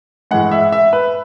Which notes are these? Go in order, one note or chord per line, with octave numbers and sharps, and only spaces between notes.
A2 E3 G#3 F#5
E5
E5
B4